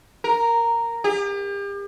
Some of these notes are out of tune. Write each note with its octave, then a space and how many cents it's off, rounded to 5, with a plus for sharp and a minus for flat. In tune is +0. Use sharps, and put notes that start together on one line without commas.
A#4 -5
G4 +40